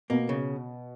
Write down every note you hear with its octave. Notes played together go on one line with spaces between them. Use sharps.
B2 A#3
C#3